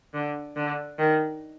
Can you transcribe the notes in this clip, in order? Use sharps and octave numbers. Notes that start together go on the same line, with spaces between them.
D3
D3
D#3